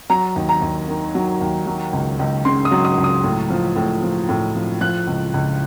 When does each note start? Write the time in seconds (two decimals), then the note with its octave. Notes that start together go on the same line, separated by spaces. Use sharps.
0.10 F#3 A#5
0.36 D#2
0.49 A#5
0.62 D#2
0.88 D#3
1.15 F#3
1.41 D#2
1.67 F#3
1.93 C#2
2.19 C#2
2.45 C#3 C6
2.65 D#6
2.71 F#3
2.85 D#6
2.98 C#2
3.04 D#6
3.24 A2
3.50 F3
3.76 A2
4.03 F3
4.29 A2
4.55 F3
4.81 F3 F#6
5.07 C#2
5.34 C#2